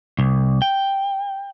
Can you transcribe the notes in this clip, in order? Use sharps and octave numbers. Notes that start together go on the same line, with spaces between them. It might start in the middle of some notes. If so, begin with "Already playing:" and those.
C2
G5